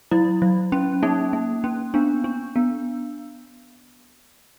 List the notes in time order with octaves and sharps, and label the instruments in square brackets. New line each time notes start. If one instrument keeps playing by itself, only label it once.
[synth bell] F#3 E4
F#3
C#4
A#3 D#4
A#3
C#4
B3 D4
D4
B3